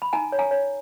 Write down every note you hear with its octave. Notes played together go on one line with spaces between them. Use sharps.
B5
D#4 G#5 A#5
C#5
G#5 A#5
C#5